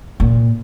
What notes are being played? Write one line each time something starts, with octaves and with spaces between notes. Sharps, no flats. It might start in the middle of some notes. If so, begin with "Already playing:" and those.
A#2